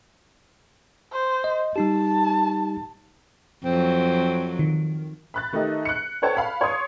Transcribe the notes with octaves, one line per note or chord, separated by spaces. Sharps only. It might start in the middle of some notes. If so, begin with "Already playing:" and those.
C5
D#5
G3 D#4 G4 A5
F2 F#3 C4
D#3
B5 F#6 A6
D#3 A3 D#4 G4 D#5
F#6 C#7
A4 C5 C#5 F#5 G5 A5
F5 B5
C#5 C6 D#6